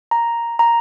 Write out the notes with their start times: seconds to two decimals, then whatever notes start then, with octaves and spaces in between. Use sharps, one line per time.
0.11 A#5
0.59 A#5